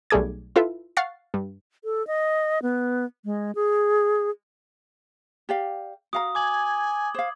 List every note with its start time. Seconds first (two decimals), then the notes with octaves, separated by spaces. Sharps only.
0.10 B1 G3 A3 G#4 D6 G#6
0.56 E4 F4 A4 B4 E5
0.97 F5 F#5 C#6 A6 C7
1.34 G2
1.84 A4
2.07 D#5
2.62 B3
3.25 G#3
3.55 G#4
5.49 G4 D5 F5
6.13 F#4 F5 A#5 D#6
6.35 G#5 D6 G#6 F#7
7.14 C5 F5